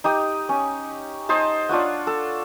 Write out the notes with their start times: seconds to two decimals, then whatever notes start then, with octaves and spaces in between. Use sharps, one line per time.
0.04 D#4 G4 D#6
0.49 C#4
1.29 D#4 C5 D#5 A5
1.69 D4 F4 C#5 F#5
2.07 A4